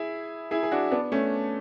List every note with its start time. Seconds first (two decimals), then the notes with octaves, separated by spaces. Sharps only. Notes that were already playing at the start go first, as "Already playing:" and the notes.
Already playing: E4 G#4
0.51 E4 G#4
0.63 G#4
0.72 D4 F#4
0.91 B3 D4
1.12 A3 C#4